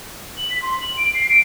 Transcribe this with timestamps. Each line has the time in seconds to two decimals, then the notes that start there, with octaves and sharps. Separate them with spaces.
0.37 F#7
0.50 B6
0.62 C6
0.81 F#7
0.97 D7
1.14 C7
1.29 D7